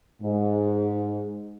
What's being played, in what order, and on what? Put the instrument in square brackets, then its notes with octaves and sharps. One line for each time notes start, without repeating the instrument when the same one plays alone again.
[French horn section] G#2